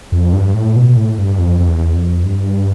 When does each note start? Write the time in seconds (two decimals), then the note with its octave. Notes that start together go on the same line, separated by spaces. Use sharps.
0.12 F2
0.33 G2
0.54 A2
0.76 B2
0.89 B2
0.97 A2
1.18 G2
1.38 F2
1.60 F2
1.68 E2
1.95 F2
2.23 G2